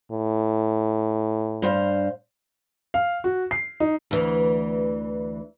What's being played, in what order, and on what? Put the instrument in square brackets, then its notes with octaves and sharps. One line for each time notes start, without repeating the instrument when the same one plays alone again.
[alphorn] A2
[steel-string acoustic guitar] G2 C5 F5
[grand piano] F5
F#4
C7
D#4
[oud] D2 E3